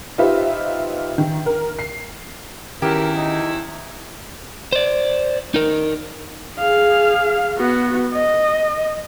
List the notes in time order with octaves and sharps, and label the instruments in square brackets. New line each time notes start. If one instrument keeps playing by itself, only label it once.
[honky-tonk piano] D#4 F4 G4 B4 C5 E5
D#3
A#4
C7
[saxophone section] E2 E4 [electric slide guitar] D#3 C#4 [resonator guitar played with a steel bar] G4 [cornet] A#4
[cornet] D#4
[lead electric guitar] C5 D5
D#4 A#4
[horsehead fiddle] G#4 F5
B3 F#4
D#5